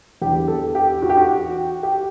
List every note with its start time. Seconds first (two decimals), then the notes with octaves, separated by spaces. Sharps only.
0.22 E2 D3 G4
0.48 A4
0.75 G4
1.02 F#4
1.10 G4
1.17 F#4
1.83 G4